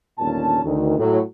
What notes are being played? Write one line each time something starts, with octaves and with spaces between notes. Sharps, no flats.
G1 D#2 A#2 C#4 A5
D2 D#3
A2 F#3